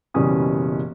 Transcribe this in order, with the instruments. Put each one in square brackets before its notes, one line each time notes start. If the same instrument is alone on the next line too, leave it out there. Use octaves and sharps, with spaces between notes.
[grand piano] F#1 B2 E3 G3 C#4 D#6